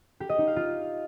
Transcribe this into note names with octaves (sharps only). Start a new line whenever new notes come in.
G4
D#5
D#4
F5
F4